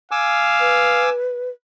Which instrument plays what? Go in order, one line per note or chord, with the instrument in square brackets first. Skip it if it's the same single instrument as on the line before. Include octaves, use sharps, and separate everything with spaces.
[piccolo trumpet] F5 [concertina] G#5 D6 E6
[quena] B4